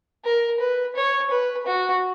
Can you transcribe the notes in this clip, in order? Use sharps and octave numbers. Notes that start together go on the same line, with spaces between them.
A#4
B4
C#5
B4
F#4